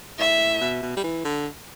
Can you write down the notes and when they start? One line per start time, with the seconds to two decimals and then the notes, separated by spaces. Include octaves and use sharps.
0.19 A2 E5
0.61 B2
0.83 B2
0.97 G3
1.04 E3
1.25 D3